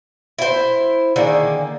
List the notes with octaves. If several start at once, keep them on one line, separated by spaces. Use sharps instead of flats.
E4 C5
D3 D#3 A#3 G#4